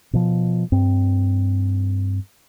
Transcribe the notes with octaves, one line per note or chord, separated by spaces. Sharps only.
B2 F3
G2 C4